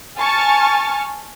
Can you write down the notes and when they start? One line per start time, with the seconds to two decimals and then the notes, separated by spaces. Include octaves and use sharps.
0.16 G#5 A5 C#6 F6 A6